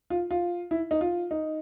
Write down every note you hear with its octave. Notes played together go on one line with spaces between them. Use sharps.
F4
F4
E4
D#4
F4
D#4